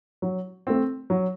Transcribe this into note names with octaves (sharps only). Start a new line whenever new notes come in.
F#3
A3 C4
F#3